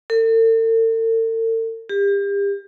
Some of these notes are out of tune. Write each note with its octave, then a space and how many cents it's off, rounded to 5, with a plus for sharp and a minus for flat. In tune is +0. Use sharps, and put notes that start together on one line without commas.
A4 +45
G4 +35